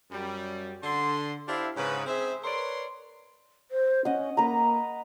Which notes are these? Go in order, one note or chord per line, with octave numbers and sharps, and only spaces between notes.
F#2 G3
D3 C6
D4 E4 G4 C5 E5 F5
G#2 C#3 B4
C4 G#4 C5 E5
A#4 B4 C#5 D5 C6
C5
C#4 D#5 F#5
A#3 B4 A#5